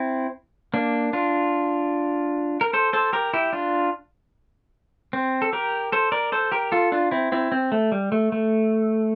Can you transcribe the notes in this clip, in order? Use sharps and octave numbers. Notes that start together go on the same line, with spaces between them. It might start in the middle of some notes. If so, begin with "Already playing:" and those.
Already playing: C4 E4
A#3 D4
D4 F4
A#4
A4 C5
A4 C5
G4 A#4
E4 G4
D4 F4
C4
A4
G4 A#4
A4 C5
A#4 D5
A4 C5
G4 A#4
F4 A4
D4 F4
C4 E4
C4 E4
C4
A3
G3
A3
A3